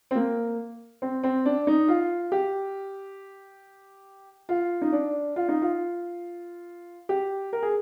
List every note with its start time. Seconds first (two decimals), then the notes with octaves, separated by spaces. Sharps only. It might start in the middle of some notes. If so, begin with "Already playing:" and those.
0.11 C4
0.15 A#3
1.02 C4
1.24 C4
1.45 D4
1.67 D#4
1.88 F4
2.32 G4
4.49 F4
4.82 D#4
4.92 D4
5.36 F4
5.49 D#4
5.62 F4
7.09 G4
7.53 A#4
7.62 G#4